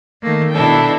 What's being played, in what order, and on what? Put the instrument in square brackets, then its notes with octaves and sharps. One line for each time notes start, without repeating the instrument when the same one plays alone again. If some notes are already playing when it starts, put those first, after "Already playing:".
[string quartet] D#3 A3 A#3
B2 D4 E4 A4 G5